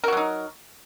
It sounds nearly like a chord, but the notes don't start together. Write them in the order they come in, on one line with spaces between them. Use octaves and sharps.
A#4 F#4 F#3 D#4